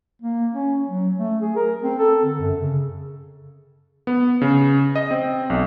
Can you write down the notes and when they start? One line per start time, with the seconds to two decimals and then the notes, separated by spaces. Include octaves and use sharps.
0.22 A#3
0.54 C#4
0.87 F#3
1.19 A3
1.41 G#4
1.56 A#4
1.83 C4
1.99 A4
2.24 D3
2.40 F#2
2.57 C#3
4.07 B3
4.42 C#3
4.96 D#5
5.11 C4
5.50 B1